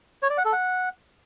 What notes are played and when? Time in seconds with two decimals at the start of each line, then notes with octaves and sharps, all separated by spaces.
0.23 C#5
0.30 D5
0.38 F#5
0.45 A4
0.53 F#5